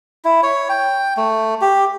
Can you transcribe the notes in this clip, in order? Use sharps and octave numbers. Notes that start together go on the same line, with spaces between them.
E4
C#5
G5
A3
G4